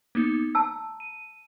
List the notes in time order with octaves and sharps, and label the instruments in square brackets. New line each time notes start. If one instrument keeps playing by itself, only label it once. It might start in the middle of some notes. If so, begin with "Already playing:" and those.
[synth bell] A#3 B3 D#4
[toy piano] A5 E6 [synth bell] A#5
[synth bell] D#7